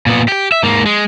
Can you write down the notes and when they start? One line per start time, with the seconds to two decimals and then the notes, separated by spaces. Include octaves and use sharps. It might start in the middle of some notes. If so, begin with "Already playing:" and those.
0.06 A#2 B3
0.28 G4 G5
0.52 E5
0.63 G#2 A#3
0.86 G#3